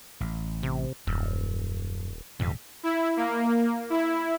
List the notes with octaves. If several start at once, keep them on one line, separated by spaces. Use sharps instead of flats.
A1
C3
D#1 F#2
D#1 F2 G#2 C3
E4
A#3
E4